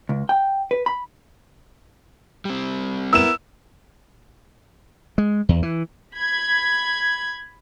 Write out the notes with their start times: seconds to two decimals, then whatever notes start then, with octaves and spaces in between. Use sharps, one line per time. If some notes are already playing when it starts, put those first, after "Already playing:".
0.09 C#2
0.29 G5
0.71 B4
0.86 B5
2.45 G3 C4
3.13 B3 E4 A#4 E6 E7
5.18 G#3
5.49 E2
5.63 E3
6.15 B5 G#6